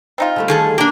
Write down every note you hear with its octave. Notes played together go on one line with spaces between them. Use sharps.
C4 D#4 F4
D3 G3 A3
D#3 G#4 A4
A#3 C#4 D4 G4